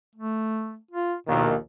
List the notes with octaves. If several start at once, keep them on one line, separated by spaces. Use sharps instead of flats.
A3
F4
A#1 D#2 B2 D#3